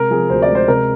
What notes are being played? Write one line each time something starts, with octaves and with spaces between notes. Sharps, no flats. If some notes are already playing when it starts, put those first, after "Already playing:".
Already playing: C3 G#3 A#4
F3 G#4
D2 C5
D5
G#3
C5
C3 A#4